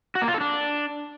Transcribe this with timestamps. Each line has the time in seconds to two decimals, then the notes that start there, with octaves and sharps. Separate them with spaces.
0.15 F#4
0.22 A#3
0.28 F4
0.34 A4
0.41 D4